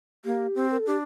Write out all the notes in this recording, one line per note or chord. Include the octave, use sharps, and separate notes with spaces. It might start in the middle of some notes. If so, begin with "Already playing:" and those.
A#3 G4
C4
A#4
A4
D4 G4